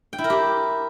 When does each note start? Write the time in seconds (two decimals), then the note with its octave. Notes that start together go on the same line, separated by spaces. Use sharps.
0.13 G5
0.18 E4
0.24 A#4
0.30 G4